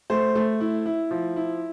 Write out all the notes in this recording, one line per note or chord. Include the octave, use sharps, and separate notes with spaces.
A3 C5
A3
E4
E4
F3
E4